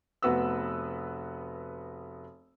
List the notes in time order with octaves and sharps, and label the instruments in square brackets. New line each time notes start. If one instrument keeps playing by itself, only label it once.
[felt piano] F1 B3 F#4 B4 E6